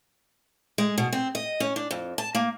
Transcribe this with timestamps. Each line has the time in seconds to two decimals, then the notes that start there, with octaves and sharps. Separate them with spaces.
0.78 G#3
0.98 B2
1.13 C4
1.35 D#5
1.60 C#4
1.76 D4
1.91 F2
2.18 A5
2.35 A#3